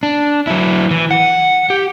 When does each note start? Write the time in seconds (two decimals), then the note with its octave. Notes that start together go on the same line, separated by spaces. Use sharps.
0.03 D4
0.47 F#3 E4
0.91 E3
1.11 F#5
1.70 G4